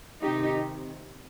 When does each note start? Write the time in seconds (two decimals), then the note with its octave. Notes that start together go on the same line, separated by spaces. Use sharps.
0.22 C3 D#3 D#4 G4